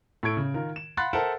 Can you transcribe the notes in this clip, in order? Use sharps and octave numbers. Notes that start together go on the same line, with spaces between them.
A2 A4 C#6 G#6 D7
C#3
D#3 F4 A#4
E7
F5 F#5 B5 C6 F#6 A6
A4 A#4 C5 E5 F#5 A5